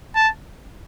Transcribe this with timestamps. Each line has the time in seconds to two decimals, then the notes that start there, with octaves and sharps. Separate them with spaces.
0.15 A5